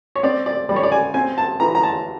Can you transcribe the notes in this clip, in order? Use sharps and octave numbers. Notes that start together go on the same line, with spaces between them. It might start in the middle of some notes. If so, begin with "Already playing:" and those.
C#5
C4 D5
D5
G3 D5
C#5
D5
G#5
C4 G#5
A5
E3 A#5
A#5
A5